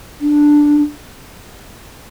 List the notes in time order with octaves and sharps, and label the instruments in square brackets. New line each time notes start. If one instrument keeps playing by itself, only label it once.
[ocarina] D4